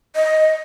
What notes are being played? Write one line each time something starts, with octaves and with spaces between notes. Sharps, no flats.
D#5